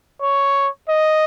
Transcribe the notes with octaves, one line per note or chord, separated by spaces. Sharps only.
C#5
D#5